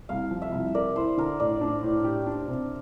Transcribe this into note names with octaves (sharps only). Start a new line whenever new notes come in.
C2 F5
F3
E5
C2
A#4 D5
E4 C5
D3 A#4
A2 D5
D4
A2
G4
D4
C3